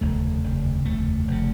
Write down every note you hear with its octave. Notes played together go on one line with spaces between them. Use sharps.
F1 D#2 C#3 A3
F1 D#2 C#3
F1 D#2 C#3 A3
F1 C#3